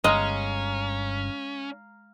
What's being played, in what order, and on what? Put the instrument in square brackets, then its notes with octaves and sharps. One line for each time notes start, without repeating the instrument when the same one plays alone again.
[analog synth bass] G1 [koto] G#3 D#5 [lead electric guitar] C#4 [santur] F5 A#5